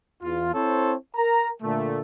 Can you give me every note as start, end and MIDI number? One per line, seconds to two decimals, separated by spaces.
0.22 0.51 40
0.22 0.51 65
0.54 0.95 60
0.54 0.95 64
0.54 0.95 69
0.54 0.95 72
0.54 0.95 73
1.16 1.50 70
1.16 1.50 82
1.62 2.01 46
1.62 2.01 50
1.62 2.01 57